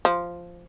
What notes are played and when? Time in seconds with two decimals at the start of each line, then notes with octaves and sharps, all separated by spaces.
0.05 F3